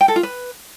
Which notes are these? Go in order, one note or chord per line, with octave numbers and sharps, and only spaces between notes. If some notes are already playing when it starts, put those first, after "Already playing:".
G5
A4
F4
B4